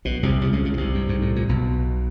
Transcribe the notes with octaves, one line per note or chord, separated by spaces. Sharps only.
B1 B2
C2 C3
C2 C3
C#2 C#3
C#2 C#3
B2
C2 C3
G2
G#2
A2
A#2
B1 B2